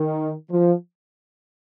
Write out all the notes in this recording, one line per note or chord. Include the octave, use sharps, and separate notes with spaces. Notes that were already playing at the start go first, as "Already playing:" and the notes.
Already playing: D#3
F3